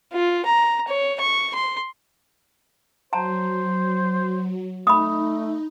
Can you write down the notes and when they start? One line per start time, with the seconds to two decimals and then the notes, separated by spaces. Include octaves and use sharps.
0.13 F4
0.45 A#5
0.88 C#5
1.20 C#6
1.54 C6
3.13 F#3 C5 A5 A#5
4.87 A3 D#4 B5 D#6